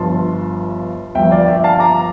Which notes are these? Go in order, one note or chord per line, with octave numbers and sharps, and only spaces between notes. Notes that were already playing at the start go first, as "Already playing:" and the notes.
Already playing: G1 G2 F3 A5 C6
G1 G2 F3 E5 G5
D5 F5
E5 G5
F5 A5
A#5 D6